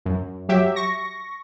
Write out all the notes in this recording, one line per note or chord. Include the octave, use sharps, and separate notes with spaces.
F#2
F#3 G4 E5
C#6 A#6